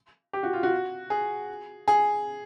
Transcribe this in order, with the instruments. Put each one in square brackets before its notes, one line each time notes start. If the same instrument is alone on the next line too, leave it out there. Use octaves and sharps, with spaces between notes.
[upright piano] G4
F#4
F4
F#4
G#4
G#4